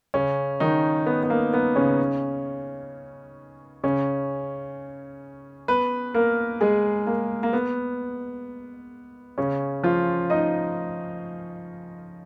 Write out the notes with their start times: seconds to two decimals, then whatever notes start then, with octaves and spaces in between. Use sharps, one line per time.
0.14 C#3 C#4
0.60 D#3 D#4
1.06 B3
1.23 B3
1.30 A#3
1.53 B3
1.76 C#3 C#4
3.84 C#3 C#4
5.68 B3 B4
6.14 A#3 A#4
6.61 G#3 G#4
7.07 A#3
7.43 A#3
7.53 B3
9.38 C#3 C#4
9.84 F3 F4
10.30 D#4 D#5